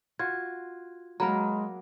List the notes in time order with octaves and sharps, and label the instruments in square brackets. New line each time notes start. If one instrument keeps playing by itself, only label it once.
[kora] F4 F#4 [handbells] G#6
[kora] F#3 A#3 A#4 [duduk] G#3 [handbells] A#5 B5